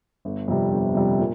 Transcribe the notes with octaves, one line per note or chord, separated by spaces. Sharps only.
G1
F2 C3 G3
G1
F2 C3 G3
A#2